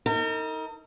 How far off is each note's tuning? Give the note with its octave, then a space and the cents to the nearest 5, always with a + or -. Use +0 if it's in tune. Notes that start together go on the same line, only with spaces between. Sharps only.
D#4 +30 A#4 -40